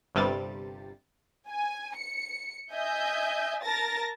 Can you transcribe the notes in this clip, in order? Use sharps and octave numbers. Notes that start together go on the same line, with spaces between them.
G1 G2 C3 G3 A6
G#5
C#7
D#5 E5 G#5 G6
A#4 A5 A6 A#6